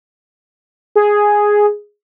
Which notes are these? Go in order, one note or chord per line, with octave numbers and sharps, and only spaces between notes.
G#4